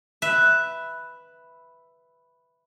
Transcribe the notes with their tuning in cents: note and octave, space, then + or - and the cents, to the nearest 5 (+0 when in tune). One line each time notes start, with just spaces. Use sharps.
B4 +0 E5 +0